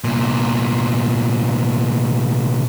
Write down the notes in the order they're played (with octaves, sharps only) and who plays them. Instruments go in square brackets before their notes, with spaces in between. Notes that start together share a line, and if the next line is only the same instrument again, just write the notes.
[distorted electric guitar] C2 A#2